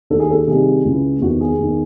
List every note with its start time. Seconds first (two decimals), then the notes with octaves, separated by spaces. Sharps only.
0.10 D#2 D#3 A4
0.19 G#4
0.30 A4
0.47 C2 C3 D#3 G#4
0.85 C#2 C#3 E3
1.21 E2 C3 D#3 F#4
1.41 G#4
1.59 E2 D#3